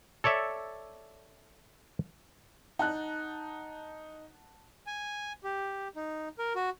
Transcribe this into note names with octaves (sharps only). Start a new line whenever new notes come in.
A4 C#5 D5 E5
D#4 F#5 A5 F#6
G#5
G4
D#4
A#4
F#4